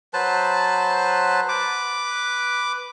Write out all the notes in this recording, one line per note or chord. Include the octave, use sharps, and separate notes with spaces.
F#3 B4 C5 A5
B4 D6